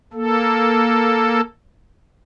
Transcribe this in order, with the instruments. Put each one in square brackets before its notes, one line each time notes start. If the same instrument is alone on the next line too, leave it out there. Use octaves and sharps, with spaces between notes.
[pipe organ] A#3 A4